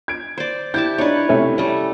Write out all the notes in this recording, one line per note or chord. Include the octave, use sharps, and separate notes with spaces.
G#6 D7
C5 D5
E4 G4 A5 G6
D4 D#4 B4 C#5
C3 A3 C#4
G3 A3 C#4